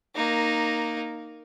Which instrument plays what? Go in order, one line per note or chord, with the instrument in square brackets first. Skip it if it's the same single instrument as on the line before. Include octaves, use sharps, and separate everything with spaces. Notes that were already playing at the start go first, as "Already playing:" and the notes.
[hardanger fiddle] A#3 D#4